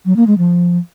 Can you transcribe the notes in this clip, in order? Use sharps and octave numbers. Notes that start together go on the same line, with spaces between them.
F#3
A#3
G#3
F3